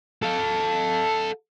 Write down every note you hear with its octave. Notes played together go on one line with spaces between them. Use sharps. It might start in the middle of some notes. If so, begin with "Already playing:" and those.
A4 F5